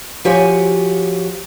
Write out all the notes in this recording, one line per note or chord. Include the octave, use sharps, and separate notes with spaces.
F3 F#4 G4 C#5 G#5